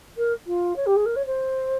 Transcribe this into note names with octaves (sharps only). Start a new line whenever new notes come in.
A#4
F4
C#5
G4
G#4
A#4
C#5
C5